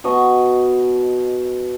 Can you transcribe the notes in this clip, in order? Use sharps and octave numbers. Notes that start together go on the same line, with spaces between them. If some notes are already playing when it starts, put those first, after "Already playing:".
B2 D#5 C#6